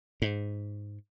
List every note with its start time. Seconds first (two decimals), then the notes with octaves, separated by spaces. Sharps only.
0.22 G#2